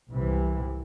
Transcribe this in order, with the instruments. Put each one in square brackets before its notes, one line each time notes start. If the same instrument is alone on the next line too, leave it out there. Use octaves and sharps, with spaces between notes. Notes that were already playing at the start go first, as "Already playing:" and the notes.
[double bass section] C2 C3 E3